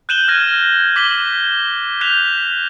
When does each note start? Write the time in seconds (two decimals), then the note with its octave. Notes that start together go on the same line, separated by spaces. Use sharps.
0.09 F#6 G6 D#7 E7 F#7 G7
0.28 F6 F#6 G#6 A#6
0.96 D6 B6 F#7 G7
2.01 F#6 G6 B6 E7 F7